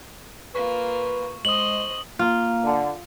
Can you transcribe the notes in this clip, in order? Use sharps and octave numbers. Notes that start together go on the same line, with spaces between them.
A#3 F4 B4 C#6
G#3 C5 D#5 D#6 F#7 G7
A#3 F4
D3